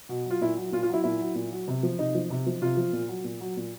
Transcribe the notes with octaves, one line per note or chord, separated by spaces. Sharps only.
B2
F#3
F4
A#2 E4
F#3
A#2 F4
F4
F#3 E4
A#2 E4
F#3
A#2
F#3
C3
F3
C3 D#4
F3
C3
F3
C3 F4
F3
A#2
F#3
A#2
F#3
A#2